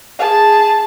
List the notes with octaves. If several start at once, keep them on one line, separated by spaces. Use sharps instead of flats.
G#4 A5